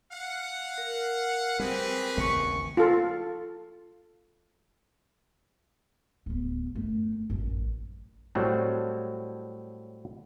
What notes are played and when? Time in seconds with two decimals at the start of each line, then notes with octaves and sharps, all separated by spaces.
0.12 F5 F#5
0.78 A#4
1.60 G3 C4 G4 G#4 B4
2.17 A1 D#2 C#3 C#6
2.77 F4 A4
6.26 D1 B3
6.75 F#2 A3
7.30 A1 F#2
8.35 A2 F#3 G3 A3 C4